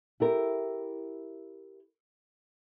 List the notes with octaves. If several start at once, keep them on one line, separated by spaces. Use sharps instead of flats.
E4 G4 A#4